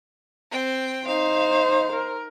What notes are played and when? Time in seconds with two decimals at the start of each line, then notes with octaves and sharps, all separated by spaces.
0.51 C4 G5
1.07 D#4 C5 F5
1.93 A#4